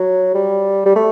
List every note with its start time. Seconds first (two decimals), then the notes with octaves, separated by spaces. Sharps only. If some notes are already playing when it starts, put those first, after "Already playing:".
Already playing: F#3
0.34 G3
0.86 G3
0.96 A3